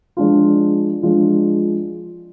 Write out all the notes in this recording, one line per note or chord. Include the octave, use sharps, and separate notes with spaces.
F3 G#3 D4 F4
F3 G#3 D4 F4